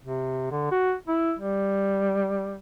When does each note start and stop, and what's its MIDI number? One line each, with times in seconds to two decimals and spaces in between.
0.05 0.50 48
0.51 0.68 50
0.71 0.94 66
1.08 1.33 64
1.39 2.58 55